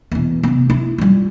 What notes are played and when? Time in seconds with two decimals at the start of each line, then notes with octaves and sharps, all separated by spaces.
0.12 E2 B2
0.43 C3 B3
0.70 E4
0.98 G3 F4